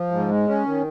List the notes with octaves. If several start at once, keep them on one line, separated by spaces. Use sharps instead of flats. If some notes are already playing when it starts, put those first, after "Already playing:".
Already playing: F3
G#2
G#3
C#4
D#3